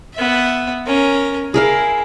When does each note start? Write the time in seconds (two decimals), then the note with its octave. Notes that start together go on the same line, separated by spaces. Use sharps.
0.15 B3 E5
0.87 C#4 A#4
1.54 E4 G#4 A#4 F5